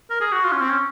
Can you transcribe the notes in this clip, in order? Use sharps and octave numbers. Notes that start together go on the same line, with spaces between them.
A#4
G#4
F#4
F4
C#4
C4
C#4